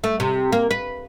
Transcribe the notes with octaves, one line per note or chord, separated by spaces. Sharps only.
A3
C3
A#3
B4